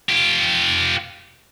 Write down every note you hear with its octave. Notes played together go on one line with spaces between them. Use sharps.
F4 G4